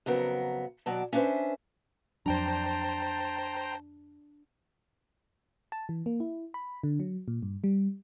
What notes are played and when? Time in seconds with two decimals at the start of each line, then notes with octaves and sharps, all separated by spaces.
0.06 F2 C#3 F#3 B3 A#4
0.86 D#2 B2 F#3 D5 A5
1.13 C#4 D4 E4 B4 C5 E5
2.26 F2 F#3 D4 C5 G5 A5 A#5
5.72 A5
5.89 E3
6.06 A#3
6.20 E4
6.54 B5
6.83 D3
7.00 F#3
7.28 A#2
7.43 G2
7.64 G3